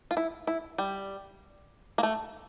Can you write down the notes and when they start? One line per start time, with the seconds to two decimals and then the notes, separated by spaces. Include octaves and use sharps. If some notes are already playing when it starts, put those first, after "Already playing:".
0.11 F4
0.17 E4
0.47 E4
0.78 G3
1.98 A#3
2.03 A3